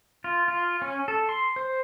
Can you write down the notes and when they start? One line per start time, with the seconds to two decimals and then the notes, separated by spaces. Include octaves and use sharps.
0.24 F4
0.48 F4
0.82 C#4
1.08 A4
1.29 C6
1.56 C5